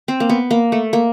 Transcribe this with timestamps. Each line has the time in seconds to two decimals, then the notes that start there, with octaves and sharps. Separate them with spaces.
0.08 C4
0.20 A#3
0.29 B3
0.51 A#3
0.72 A3
0.93 A#3